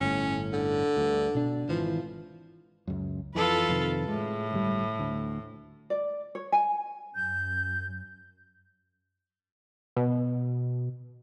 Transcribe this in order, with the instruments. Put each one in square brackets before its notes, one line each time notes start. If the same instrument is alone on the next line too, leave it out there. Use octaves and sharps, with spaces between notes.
[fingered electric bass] G1 A2 [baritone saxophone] C#4
[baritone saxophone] D3
[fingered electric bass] D2 G2
B2 D4
[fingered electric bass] G#1 E3 [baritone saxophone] F3
[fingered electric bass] C#2 F#2
[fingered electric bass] F2 E3 [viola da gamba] F4 A4 B4
[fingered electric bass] F2 C3 D#3
[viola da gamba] A2 [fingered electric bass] G#3
[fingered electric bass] G1 G3
D2
[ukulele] D5
C#5
G#5
[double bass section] F#2 [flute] G6
[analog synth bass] B2